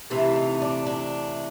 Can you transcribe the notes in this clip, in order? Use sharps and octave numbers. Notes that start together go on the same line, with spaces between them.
C3 E3 A3 C4 E4
D#4
D4
D4